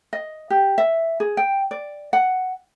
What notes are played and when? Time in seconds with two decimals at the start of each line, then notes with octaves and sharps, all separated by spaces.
0.13 D#5
0.50 G4
0.78 E5
1.20 G#4
1.37 G5
1.71 D5
2.13 F#5